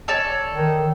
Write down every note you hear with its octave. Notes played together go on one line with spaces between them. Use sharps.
A4 C#5 D5
D#3